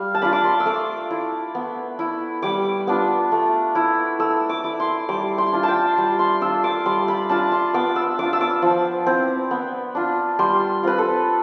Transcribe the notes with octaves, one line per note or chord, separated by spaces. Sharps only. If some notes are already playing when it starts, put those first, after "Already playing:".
Already playing: G3 F5
A5
D4 F4 B5
D6
C6
E6
A3 D6
E4
B3
E4
G3 D6
B3 D4 F4
A3
E4
A3 E6
D6
E4
C6
G3 D6
C6
D4 F4
G5 A5
G3
C6
D4 F4 E6
D6
G3 C6
B5
D4 F4 A5
C6
B3 D6
E6
D4 F4 D6
E6
D6
F3
C4 E4
B3
D4 F4
G3 C6
C4 F4 B4
A4